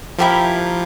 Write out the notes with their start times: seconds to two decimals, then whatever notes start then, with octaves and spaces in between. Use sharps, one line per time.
0.18 F3 E4 G4 A#4